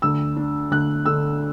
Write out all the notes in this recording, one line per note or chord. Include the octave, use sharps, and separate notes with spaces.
D2 E6
D4
D2 F#6
D3 E6